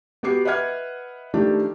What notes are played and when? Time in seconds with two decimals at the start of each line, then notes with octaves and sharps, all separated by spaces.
0.23 B3 F#4 G4 D6 C7
0.45 B4 D#5 E5 F#5 F6 G#6
1.34 D#3 F3 A3 D4 G4